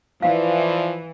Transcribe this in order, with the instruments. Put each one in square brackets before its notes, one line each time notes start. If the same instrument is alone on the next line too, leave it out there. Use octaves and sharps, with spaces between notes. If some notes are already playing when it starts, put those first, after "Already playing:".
[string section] E3 [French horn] F3 [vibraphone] B4 D5 E5 [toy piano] F5